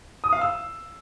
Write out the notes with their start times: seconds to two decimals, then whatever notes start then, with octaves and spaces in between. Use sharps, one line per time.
0.24 D#6
0.33 F5
0.42 E6